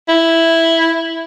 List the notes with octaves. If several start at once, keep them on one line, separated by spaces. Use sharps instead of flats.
E4